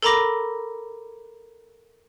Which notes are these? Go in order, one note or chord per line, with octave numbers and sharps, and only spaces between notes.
A4 A#4 A#5 B5 D6 A#6